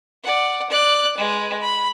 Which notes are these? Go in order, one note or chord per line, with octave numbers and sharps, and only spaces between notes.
D5 F#5
D5 F#6
G#3 B4
B5